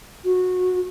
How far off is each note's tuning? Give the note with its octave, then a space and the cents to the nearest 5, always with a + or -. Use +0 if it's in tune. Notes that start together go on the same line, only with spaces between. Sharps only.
F#4 -15